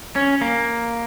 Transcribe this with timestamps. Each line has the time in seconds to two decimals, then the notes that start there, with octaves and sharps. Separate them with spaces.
0.16 C#4
0.41 A#3